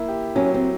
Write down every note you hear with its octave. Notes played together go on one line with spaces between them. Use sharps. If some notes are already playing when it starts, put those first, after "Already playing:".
Already playing: A#3 E4
G4
F#3 C#4
C4